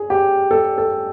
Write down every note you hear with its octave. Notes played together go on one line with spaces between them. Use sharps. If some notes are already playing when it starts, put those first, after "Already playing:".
Already playing: G#4
G4
A4
A4